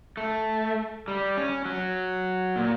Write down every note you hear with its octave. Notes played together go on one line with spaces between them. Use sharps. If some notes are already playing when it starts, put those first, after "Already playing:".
A3
G3
C#4
F#3
A#2